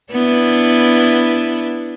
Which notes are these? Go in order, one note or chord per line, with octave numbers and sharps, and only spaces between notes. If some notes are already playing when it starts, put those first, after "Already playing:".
B3 D4 E4